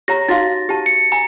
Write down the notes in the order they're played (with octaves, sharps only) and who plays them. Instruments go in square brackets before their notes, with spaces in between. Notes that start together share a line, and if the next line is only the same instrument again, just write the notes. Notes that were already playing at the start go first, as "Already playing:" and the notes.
[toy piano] G4 C#5 A#5 [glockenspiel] A#6
[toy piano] D#4 F#4 F5 [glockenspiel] A6
[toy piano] G4 A5
[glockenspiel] C#7
[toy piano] G#5 [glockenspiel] A#5